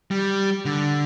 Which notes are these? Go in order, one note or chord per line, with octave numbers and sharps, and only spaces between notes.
G3
D3